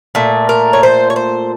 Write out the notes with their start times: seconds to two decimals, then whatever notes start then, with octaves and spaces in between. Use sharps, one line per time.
0.15 A#2 A3
0.49 A#4
0.73 C#5
0.83 C5
1.10 C#5
1.16 C5